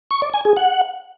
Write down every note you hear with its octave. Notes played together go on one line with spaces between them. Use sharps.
C#6
D5
G#5
G#4
F#5